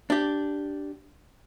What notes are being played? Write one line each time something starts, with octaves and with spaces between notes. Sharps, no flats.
D4 G4